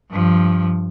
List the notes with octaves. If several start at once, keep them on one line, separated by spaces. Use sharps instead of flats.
G2 F3